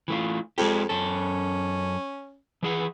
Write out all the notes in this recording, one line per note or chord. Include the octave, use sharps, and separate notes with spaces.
E3 A3 F4
F2 G#3 G4
F#2 C#4 A4
E3 G#4 F#5